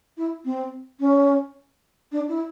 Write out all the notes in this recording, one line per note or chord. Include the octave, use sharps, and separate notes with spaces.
E4
C4
C#4
D4
E4